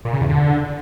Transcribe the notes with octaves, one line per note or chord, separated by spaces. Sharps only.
A#2
C#3
E2
D3